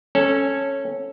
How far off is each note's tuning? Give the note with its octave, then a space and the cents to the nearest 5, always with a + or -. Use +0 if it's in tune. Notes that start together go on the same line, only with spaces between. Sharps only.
C#4 -10 A4 +0